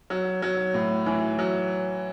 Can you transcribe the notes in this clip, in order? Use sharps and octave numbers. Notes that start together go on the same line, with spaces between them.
F#3
F#3
A2
E3
F#3